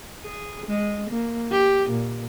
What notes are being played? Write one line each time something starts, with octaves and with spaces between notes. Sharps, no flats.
G#4
G#3
A#3
G4
A#2